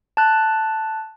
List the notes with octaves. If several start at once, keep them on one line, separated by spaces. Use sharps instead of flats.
A5 F#6